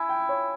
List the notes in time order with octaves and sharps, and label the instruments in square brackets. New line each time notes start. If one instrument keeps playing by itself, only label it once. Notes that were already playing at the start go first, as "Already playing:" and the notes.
Already playing: [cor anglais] E4 [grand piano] G#5
[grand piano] G5
C#5